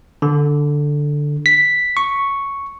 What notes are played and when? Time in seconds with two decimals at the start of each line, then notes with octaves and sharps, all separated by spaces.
0.22 D3
1.46 B6
1.97 C#6